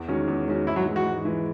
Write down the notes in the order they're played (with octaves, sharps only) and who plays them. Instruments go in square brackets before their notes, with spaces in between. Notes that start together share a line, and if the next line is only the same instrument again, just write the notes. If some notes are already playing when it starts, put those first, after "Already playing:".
Already playing: [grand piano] E2
D#3 G#3 C#4 F#4
E2
D#3 G#3 C#4 F#4
[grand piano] G#2 [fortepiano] E4
[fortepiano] F#3
[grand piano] E3 G#3
[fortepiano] F#4
[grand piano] G#2
E3 G#3